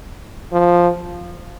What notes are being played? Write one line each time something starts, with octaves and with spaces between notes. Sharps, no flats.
F3